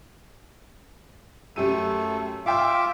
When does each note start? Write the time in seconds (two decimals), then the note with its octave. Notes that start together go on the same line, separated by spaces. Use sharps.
1.56 F#2 A3 G4 A4 D#7
2.46 F4 E5 F5 G5 D6 E6